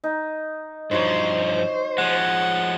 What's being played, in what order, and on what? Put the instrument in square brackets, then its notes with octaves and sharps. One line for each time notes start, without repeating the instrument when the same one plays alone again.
[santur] D#4
[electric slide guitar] G2 F3 [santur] D#4 F#4 C#5 [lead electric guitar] C5
[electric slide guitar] F3 G#3 [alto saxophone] F#5